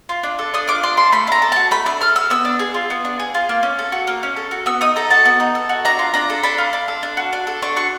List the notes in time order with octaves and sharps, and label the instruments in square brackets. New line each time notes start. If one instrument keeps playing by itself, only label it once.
[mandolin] F4
D4
A4
D4 D#6
F4 D6
D4 C6
A4 C6
A3 B5
D4 A#5
A4
F#4 A5
A3 B5
D4 E6
A4 F6
F#4 E6
B3 E6
D4
G#4
F4
B3
D4
G#4
F4
A#3
C#4
A4
F#4
A#3
C#4
A4
F#4
B3 E6
D#4 D#6
A4 A#5
F#4 A5
B3
D#4
A4
F#4
D4 A#5
F4
D4 A#5
A4
D4 B5
F4
D4
A4
D4
F#4
D4
A4
D4 C#6
F#4 C#6